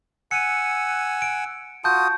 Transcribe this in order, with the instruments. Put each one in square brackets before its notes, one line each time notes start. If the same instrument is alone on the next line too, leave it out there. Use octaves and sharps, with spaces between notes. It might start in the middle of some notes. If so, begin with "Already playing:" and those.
[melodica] F#5 G#5 E6 [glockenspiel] C#7 D#7
[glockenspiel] D7
[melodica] F4 F#4 D#6 [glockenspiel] A5 G6